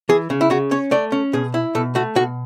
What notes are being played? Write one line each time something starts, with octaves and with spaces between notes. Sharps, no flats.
E3 G#4
C#3
E4
C#3 F#4
C#4 C#5
A3 D5
C#4
B2 G#4
E4
B2 A4
A3 F#4
B2 F#4